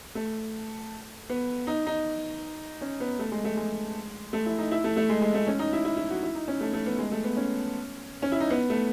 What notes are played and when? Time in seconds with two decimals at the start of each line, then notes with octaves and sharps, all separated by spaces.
0.15 A3
1.29 B3
1.67 D#4
1.87 D#4
2.81 C#4
3.00 B3
3.19 A3
3.32 G#3
3.44 A3
3.57 G#3
4.33 A3
4.46 E4
4.58 D#4
4.71 E4
4.84 A3
4.96 A3
5.09 G#3
5.21 G#3
5.34 A3
5.47 C#4
5.59 D#4
5.73 E4
5.85 E4
5.97 E4
6.10 F#4
6.23 E4
6.35 D#4
6.48 C#4
6.61 A3
6.73 A3
6.86 B3
6.98 G#3
7.11 A3
7.24 B3
7.37 C#4
8.22 C#4
8.32 E4
8.40 D#4
8.50 B3
8.70 A3